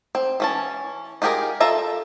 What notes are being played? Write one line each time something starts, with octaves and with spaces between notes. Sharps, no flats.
C4
E3 C#4 A5
D#4 F4 G4 G#4 A#4
F4 A4 E5 A#5